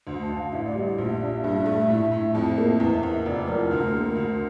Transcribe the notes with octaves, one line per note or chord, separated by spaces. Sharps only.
D2
A5
D2
F5
A1 E5
D5
G3 E5
A#1
D4
G2 E5
A3
A2
A2
F2 E5
A#3
E2
E2
F1 D5
F3 A#4
D2
A#3
D2